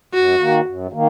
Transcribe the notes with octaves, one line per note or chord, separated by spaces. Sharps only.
F#2 F#4
D#3 A#3
F#2
D#3 A#3